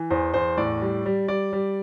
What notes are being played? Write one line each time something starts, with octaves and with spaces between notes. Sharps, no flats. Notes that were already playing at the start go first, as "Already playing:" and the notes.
Already playing: E3
E2 C5
E2 C5
A2 D5
G3
G3
G3 D5
G3